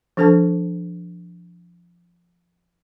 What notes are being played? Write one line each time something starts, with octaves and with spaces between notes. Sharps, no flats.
F3 D4 A4 C5 A5